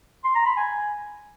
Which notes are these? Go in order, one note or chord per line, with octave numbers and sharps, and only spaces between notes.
C6
A#5
B5
G#5